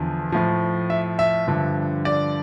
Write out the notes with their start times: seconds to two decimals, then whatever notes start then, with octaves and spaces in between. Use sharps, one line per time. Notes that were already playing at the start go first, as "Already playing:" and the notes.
Already playing: E2 D3 F3
0.32 A2 F3
0.90 E5
1.19 E5
1.47 G2 D3 F3
2.05 D5